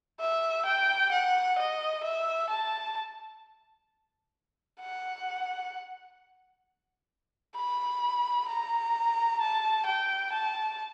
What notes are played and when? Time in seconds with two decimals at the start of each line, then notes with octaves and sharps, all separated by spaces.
0.20 E5
0.65 G5
1.11 F#5
1.58 D#5
2.03 E5
2.50 A5
4.81 F#5
7.56 B5
8.48 A#5
9.41 A5
9.86 G5
10.33 A5